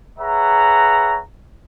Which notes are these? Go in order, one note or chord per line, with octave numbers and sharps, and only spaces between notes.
G#4 B4 C#5 E5 F#5 A#5